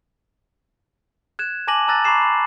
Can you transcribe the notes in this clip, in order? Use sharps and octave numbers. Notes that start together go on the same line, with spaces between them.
F#6 G#6 E7
G#5 A5 D6 A#6 D#7 F#7
A5 A#5 E6 F#6 A6 A#6
A#5 B5 C#6 D6 C7 E7
B5